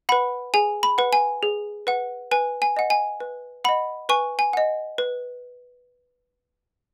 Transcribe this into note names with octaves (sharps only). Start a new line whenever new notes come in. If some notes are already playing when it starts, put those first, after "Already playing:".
B4 F#5 B5
G#4 G#5
B5
B4 F#5
G#5
G#4
B4 F#5
B4 G#5
G#5
D#5 F#5
G#5
B4
D#5 F#5 B5
B4 G#5 C#6
G#5
D#5 F#5
B4